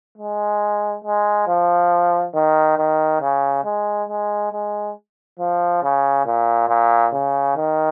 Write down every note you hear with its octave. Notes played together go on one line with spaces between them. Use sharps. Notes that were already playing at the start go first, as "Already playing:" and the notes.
G#3
G#3
F3
D#3
D#3
C#3
G#3
G#3
G#3
F3
C#3
A#2
A#2
C#3
D#3